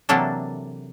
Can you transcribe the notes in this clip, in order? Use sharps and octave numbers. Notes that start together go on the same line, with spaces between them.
C3 E3 F#3 A#3 D4 A4